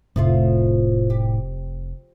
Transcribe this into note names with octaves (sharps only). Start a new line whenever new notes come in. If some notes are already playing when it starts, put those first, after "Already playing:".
F1 A2 F3 A3 F4
G4